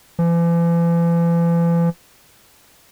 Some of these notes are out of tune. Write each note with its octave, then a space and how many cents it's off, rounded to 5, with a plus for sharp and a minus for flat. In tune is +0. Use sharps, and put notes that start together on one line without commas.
E3 +45